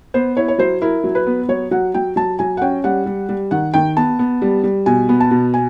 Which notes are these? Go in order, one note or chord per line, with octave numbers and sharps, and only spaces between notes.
B3 C5
E4 C#5
C#5
F#3 C5
E4 A#4
F#3
B4
B3
F#3 C#5
F#3 F#5
F#3 G5
F#3 A5
F#3 G#5
F#5
C#4 G5
G3 F#5
G3
G3
D#3 F#5
D#3 G5
B3 A5
B3
G3
G3
B2 G#5
B3
A5
B2
G#5